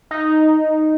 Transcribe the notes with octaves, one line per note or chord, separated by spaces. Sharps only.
D#4